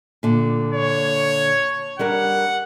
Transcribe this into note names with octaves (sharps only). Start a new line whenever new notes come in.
A#2 D3
C#5
G3 D4 A#4 F#5